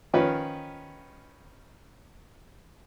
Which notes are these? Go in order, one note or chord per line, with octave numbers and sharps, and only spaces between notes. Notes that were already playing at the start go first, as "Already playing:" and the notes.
D#3 F3 C#4 F4 B4